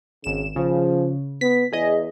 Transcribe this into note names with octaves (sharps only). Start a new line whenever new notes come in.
G#1 C#3 E7
C#3 F3
B3 B6
E2 G#4 D#5